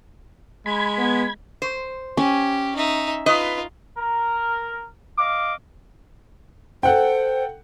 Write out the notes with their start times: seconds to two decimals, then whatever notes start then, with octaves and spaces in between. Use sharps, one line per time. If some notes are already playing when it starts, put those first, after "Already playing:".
0.66 G#3 B5 G#6
0.98 B3
1.62 C5
2.17 C#4 G4
2.76 D#4 E5
3.26 D#4 F4 B4 D#5
3.98 A#4
5.19 D#5 F5 D6
6.83 A4 C5 F#5 G5